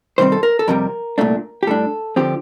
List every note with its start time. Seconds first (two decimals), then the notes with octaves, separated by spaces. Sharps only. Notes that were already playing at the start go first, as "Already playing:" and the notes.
0.18 C3 D#3 G3 C4 C5
0.32 A4
0.43 A#4
0.59 A4
0.68 F2 C3 G3 A#4
1.18 C2 A#2 A3 D4
1.63 G4
1.67 A2 G3 D4 A4
2.16 D3 F3 C4 G4